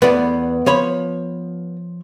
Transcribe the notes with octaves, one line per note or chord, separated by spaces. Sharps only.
E2 B3 D5
F3 C#5 B5